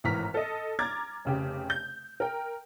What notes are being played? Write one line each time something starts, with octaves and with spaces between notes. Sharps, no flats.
G#1 A2 E3 A#5 F6 B6
A4 D#5
A#5 D6 F6 G#6 A6
F1 C#3 G4
G6
A#4 G5